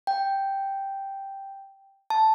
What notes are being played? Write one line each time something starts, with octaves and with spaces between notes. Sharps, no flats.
G5
A5